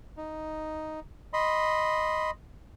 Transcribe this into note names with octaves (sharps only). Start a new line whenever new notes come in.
D#4
D#5 B5 C6